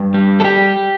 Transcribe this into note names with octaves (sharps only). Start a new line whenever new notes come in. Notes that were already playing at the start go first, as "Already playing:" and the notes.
Already playing: G2
G3
A4
G4